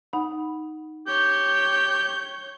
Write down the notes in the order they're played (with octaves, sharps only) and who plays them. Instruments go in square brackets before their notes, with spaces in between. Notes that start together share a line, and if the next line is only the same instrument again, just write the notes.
[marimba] D#4 F#5 B5
[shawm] G4 [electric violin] C#5 G6